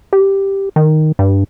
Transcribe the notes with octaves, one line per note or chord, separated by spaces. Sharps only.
G4
D#3
G2